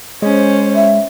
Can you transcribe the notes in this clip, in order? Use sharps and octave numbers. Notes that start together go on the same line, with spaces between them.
G#3 C#4 C5
E5